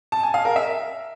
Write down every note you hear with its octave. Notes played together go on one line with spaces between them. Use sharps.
A5
G#5
F5
A#4
E5